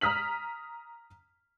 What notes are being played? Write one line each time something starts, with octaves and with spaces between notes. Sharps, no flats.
A#5 D#6 F6 B6 F#7